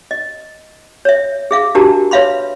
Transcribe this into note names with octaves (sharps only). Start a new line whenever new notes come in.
D#5
C#5 E5
G#4 E5 F5
D4 F#4 G4 A#4 A5 A#5
B4 C#5 E5 F5 B5 C6